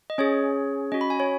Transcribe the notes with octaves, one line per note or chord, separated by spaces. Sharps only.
D#5
C#4 G#4 C#5
C#4 F#4 D#5
B5
G#5
C#5